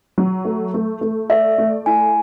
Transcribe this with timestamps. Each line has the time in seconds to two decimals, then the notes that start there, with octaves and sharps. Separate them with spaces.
0.18 F#3
0.45 A3
0.74 A3
1.01 A3
1.30 D5 E5
1.58 A3
1.86 E4 G#5